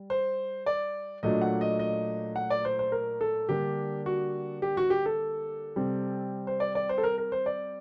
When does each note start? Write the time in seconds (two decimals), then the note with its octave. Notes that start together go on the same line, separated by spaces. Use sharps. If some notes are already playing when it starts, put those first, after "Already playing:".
Already playing: G3
0.10 C5
0.66 D5
1.23 A#2 F#3 A3 D4 D#5
1.42 F#5
1.61 D#5
1.79 D#5
2.36 F#5
2.50 D5
2.65 C5
2.79 C5
2.92 A#4
3.21 A4
3.49 D3 G3 A#3 D4 G4
4.06 F#4
4.62 G4
4.77 F#4
4.90 G4
5.06 A4
5.76 C3 G3 C4
6.47 C5
6.60 D5
6.75 D5
6.89 C5
6.98 A4
7.03 A#4
7.18 A#4
7.32 C5
7.46 D5